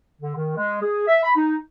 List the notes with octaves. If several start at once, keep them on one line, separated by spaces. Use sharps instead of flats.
D3
D#3
G#3
G#4
E5
B5
D#4